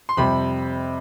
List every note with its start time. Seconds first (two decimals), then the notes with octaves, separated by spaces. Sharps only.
0.09 C6
0.17 F2 C3 G3 B5